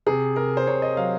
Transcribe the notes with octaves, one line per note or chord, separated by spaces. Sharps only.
C3 G#4
C3 A#4
C5
C3 C#5
D#5
F#3 F5